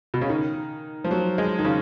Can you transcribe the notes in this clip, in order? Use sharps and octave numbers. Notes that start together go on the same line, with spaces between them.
B2
C#3
D#3
F3
F#3
G#3
D#3
C#3